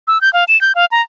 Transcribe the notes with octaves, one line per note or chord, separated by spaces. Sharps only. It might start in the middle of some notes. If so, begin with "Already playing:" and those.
E6
G6
F5
E7
G6
F5
A#5